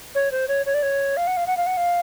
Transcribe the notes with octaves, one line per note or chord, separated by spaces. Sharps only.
C#5
C5
C#5
C#5
D5
C#5
F5
F#5
F5
F#5
F5
F#5
F5